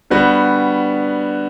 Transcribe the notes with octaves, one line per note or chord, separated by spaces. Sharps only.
D3 G3 B3 F#4